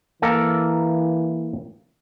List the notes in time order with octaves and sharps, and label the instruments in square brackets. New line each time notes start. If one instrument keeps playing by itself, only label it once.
[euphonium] E3 [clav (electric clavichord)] A#3 A4 A#4